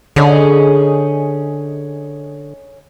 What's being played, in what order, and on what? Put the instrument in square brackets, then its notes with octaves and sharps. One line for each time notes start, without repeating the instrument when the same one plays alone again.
[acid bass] D3 [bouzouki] C#4 D#4 G#4